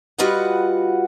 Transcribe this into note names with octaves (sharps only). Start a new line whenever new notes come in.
G3 F4 F#4 B4 D#5 F#5